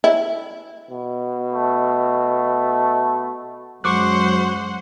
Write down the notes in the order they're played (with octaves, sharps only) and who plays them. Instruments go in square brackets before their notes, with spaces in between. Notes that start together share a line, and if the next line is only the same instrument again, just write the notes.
[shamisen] E4
[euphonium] B2
[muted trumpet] A3
[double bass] F#2 G#3 [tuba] F#3 [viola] C5 F#5 [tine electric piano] C#6 D6 F#6